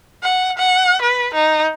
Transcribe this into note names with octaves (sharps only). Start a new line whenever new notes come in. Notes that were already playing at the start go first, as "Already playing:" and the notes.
F#5
F#5
B4
D#4